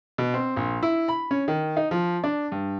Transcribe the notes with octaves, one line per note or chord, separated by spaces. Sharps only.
B2
C4
A#1
E4
B5
C#4
D#3
D#4
F3
D4
G2